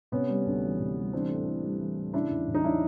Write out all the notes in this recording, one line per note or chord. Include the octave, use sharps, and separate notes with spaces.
C3 B3 C#4
G3
D2
E3
C3
G3
E3 C4 D4
A2
A2
G3
E3
A2
C#3 D4 E4
E2
E2
D#4
F#3 D4 E4